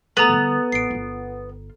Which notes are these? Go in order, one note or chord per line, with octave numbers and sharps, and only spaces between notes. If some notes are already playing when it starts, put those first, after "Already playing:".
D3 A3 B3 A4 A#5
D3 G3
A1 C7 D7
G1 F4